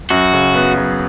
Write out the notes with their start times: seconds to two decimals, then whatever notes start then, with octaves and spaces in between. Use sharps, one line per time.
0.10 F#2 F#4
0.33 C#3
0.55 B3
0.77 F#3